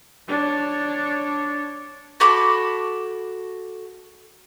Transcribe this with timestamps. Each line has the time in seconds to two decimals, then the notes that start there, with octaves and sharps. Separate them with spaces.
0.28 D4 C#5
2.20 F#4 A4 B5 D6